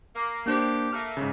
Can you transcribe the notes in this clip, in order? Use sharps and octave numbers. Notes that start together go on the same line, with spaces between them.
A#3
A#3 D4 G4 C5
A3 A#3 F6
G#2 C#3